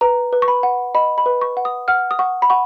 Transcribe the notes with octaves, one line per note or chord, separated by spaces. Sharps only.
B4 A#5
B4
C#6
B5
F#5
D#5 B5
B5
B4
C#6
F#5
D#6
F#5 F6
D#6
F#5 C#6
B5
F#5 C#6